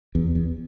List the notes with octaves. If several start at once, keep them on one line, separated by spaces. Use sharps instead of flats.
E2
E2